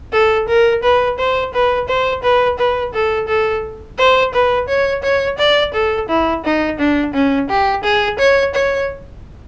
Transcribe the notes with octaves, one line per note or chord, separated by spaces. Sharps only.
A4
A#4
B4
C5
B4
C5
B4
B4
A4
A4
C5
B4
C#5
C#5
D5
A4
E4
D#4
D4
C#4
G4
G#4
C#5
C#5